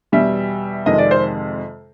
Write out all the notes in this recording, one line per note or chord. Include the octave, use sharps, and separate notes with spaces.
E2 B2 G3 E5
F2 C3 D#3 G#3 D#5
D5
C5